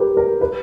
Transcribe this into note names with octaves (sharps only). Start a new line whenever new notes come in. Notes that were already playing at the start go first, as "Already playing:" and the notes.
Already playing: G4 A#4 B4
A#4
B4